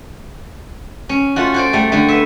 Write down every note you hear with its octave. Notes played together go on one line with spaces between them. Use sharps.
C#4
A3 F4 F#4
F#4 C5 D5
G3 A3
D3 A3
B3 E5